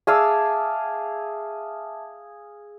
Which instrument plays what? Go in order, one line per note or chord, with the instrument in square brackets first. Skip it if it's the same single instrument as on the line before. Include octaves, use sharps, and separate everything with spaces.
[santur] G#4 F5 E6 [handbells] E5 A5 D6